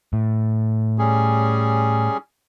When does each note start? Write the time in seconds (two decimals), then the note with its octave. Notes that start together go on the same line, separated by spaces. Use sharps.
0.13 A2
0.98 G3 C#4 G#4